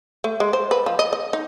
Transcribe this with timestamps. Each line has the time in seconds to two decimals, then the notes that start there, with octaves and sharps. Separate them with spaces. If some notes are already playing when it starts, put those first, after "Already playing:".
0.24 A3
0.40 G#3
0.53 C5
0.71 B4
0.86 F3
0.99 D#5
1.13 D#5
1.33 D#4